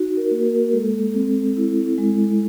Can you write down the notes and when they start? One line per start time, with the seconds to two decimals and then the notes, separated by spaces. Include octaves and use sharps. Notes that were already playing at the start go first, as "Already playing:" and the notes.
Already playing: D#4 F#4
0.17 A#4
0.31 A#3
0.45 A#4
0.73 G#3 A4
1.14 C4
1.57 E4
1.98 G#3